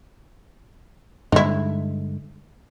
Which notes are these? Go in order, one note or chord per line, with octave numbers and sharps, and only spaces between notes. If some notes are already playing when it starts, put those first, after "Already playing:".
G2 D3 G#3 D#4 E4